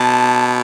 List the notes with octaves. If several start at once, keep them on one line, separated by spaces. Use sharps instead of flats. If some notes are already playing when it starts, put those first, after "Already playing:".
Already playing: B2 A5